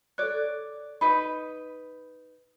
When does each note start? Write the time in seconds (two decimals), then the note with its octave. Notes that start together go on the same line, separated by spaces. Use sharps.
0.18 A4 C#5 D5 F#6
1.01 D#4 B4 B5